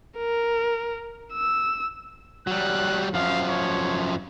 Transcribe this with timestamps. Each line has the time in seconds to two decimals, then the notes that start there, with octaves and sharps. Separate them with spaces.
0.18 A#4
1.33 E6
2.47 F#3 G3 F#6
3.14 F#2 F3 F5
3.49 C#5